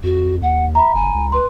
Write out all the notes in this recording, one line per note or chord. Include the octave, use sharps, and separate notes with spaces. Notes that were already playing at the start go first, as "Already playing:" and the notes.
F2 F#4
D#2 F#5
E5 A#5 B5
F#1 G#5
C#2
B4 C6